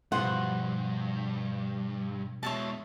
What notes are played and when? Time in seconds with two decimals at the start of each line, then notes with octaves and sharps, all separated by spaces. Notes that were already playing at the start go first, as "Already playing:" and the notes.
0.12 G2 B2 F3 G3 F4 C5 F#5 D#6
2.43 B2 G#3 C#5 E5 A5